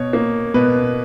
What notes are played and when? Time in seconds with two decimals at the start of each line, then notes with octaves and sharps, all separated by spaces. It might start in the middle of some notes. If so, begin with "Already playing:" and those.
Already playing: B2 C#5
0.13 A#3
0.54 B2 B4